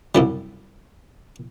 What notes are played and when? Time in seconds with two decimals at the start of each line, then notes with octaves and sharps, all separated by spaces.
0.15 C2 F#2 G3